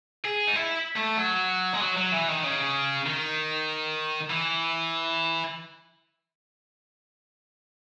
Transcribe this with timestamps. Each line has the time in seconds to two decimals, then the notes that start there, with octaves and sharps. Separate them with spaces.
0.24 G#4
0.47 D#4
0.56 E4
0.97 A3
1.18 F#3
1.74 G#3
1.80 F#3
1.96 F#3
2.12 E3
2.28 D#3
2.44 C#3
3.06 D#3
4.30 E3